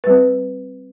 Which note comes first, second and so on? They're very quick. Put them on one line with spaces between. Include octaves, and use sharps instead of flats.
B4 G3 C4